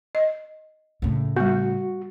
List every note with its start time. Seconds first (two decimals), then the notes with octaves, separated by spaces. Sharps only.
0.15 D#5
1.02 A2 C#3
1.36 G3 B3 F#4